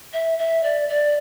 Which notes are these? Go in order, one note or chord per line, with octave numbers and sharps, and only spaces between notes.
E5
E5
D5
D5